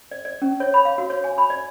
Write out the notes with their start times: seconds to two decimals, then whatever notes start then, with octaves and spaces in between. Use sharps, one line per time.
0.11 D5
0.25 D5
0.42 C#4
0.60 C#5
0.74 B5
0.85 F5
0.98 F#4
1.10 C#5
1.24 G#5
1.38 B5
1.50 D5